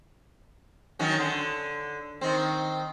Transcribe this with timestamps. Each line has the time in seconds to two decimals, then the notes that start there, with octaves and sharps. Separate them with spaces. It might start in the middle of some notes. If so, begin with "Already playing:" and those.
0.99 D#3 F#3 C#4
1.19 D3
2.21 D#3 C4